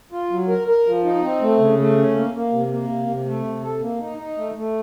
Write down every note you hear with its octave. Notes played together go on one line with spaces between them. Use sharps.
F4
F#3
A#4
A#4
F3
D#4
C4
A3
C#3
A3
C#4
A#3
A#3
C3
A#3
C3
C3
A3
C3
A4
A#3
D#4
D#4
A3
A3